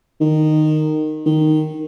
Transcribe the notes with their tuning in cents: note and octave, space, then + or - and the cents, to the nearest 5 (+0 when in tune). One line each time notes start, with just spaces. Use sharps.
D#3 -15
D#3 -5